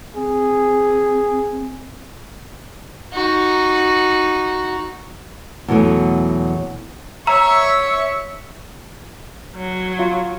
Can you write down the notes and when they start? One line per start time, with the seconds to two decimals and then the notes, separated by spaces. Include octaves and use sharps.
0.16 C4 G#4
3.13 D#4 F#4
5.68 E2 B2 F#3 A3 G#5
7.27 C#5 E5 A#5 C#6
9.56 F#3
9.99 F4